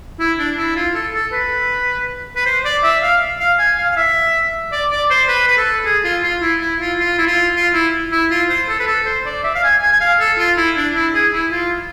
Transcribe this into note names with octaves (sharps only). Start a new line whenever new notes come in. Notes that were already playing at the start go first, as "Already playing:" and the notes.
E4
D4
E4
F4
A4
A4
B4
B4
C5
D5
E5
F5
F5
G#5
F5
F5
E5
D5
D5
C5
B4
B4
A4
G#4
F4
F4
E4
E4
F4
F4
E4
F4
F4
E4
E4
F4
C5
A4
B4
A4
C5
D5
E5
F5
G#5
G#5
G#5
F5
A4
F4
E4
D4
E4
G#4
E4
F4